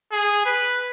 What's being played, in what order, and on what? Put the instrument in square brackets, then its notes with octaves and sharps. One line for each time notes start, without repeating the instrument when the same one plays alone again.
[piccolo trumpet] G#4
B4